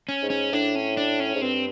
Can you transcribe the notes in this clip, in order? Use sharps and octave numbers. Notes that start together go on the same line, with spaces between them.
C#4
G#2
C#4
A2 D4
C#4
D4
C#4
G#2
G2 C4